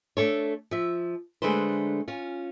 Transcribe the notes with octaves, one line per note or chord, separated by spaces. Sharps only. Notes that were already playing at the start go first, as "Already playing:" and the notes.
A3 D4 A4 C#5
F3 E5
D3 G#3 A3 D4 B4 C5
C#4 F4